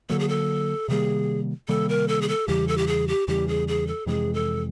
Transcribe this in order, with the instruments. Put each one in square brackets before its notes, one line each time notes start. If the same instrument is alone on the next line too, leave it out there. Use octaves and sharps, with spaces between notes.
[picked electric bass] D3 F#3 A#3 [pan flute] A4
[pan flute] G#4
A4
[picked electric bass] C3 D#3 G3 A#3 [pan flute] G#4
[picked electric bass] C3 D#3 G3 A#3 [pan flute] A4
[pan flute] A#4
A4
G#4
A4
[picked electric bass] E2 C#3 E3 G3 [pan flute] G4
[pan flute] A4
G4
G#4
G4
[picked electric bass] E2 C#3 E3 G3 [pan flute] G4
[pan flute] G#4
G#4
A4
[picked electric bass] F2 C3 E3 G#3 [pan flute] G#4
[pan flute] A4